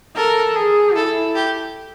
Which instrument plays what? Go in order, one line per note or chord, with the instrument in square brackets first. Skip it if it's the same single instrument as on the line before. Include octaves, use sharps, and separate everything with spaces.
[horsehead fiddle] A4 [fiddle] A#4
[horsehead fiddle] G#4
[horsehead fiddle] E4 [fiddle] A4
[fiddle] G4